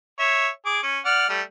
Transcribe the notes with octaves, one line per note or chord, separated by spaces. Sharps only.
C#5 E5
G#4 D6
C#4
D5 F#5 F6
G3 A3